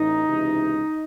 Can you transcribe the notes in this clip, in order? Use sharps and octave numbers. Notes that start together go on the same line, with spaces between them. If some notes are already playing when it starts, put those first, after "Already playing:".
Already playing: A1 D#4
C#2 C3 E3